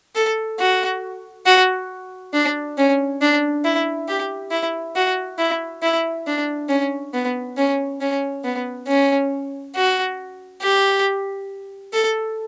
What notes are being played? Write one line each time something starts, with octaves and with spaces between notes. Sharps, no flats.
A4
F#4
F#4
D4
C#4
D4
E4
G4
E4
F#4
E4
E4
D4
C#4
B3
C#4
C#4
B3
C#4
F#4
G4
A4